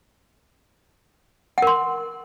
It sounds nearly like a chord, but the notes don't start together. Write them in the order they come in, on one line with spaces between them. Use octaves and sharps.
F#5 A#4 C6